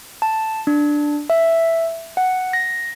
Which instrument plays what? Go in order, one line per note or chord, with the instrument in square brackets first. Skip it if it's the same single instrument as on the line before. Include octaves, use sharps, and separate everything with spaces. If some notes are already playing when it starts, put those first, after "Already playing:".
[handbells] A5
D4
E5
F#5
A#6